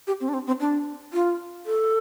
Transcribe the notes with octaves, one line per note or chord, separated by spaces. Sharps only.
G4
C4
D4
C4
C4
D4
F4
A4